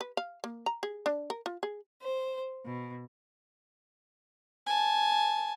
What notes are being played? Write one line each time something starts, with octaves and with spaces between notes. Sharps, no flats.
B4
F5
A#3
A#5
G#4
D4
A#4
F4
G#4
C5
B2
G#5 A5